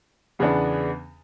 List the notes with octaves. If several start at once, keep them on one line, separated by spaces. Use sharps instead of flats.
E2 C#3 E3 B3 D4